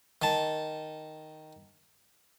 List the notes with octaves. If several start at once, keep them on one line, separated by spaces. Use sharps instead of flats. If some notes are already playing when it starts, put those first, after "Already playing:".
D#3 A5